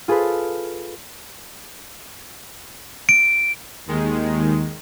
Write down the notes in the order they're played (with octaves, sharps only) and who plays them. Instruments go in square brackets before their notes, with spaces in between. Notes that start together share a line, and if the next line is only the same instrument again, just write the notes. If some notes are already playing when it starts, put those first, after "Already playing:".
[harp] F4 G#4 A4 B4
[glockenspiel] D7
[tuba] D#2 [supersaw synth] D#3 G#3